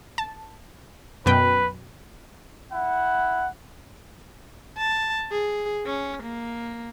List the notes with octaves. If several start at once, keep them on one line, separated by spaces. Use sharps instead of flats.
A5
F#2 B2 B4 G5
E4 F#5
A5
G#4
C#4
A#3